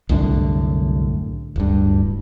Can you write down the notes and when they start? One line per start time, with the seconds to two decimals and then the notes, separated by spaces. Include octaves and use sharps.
0.09 C2 F#2 A2 D3
1.56 D1 G2